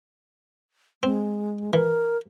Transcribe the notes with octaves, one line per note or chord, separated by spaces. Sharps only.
G#3 C4
E3 A#4